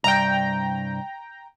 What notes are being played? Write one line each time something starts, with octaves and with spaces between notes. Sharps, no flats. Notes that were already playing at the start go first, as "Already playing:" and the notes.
C2 G2 G5 A#5